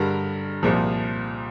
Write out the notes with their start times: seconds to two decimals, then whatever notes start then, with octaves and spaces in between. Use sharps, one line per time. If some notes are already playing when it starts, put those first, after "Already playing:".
Already playing: G2 D3 G3 A#4 A#5
0.63 C2 A#2 F3